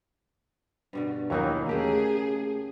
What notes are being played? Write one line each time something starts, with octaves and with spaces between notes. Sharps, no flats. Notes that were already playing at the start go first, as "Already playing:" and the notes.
G2 B2 D3
D#2 D#3 E3 F#3 A#3 D#4 C#5
C#3 A3 A#3 G4 G#4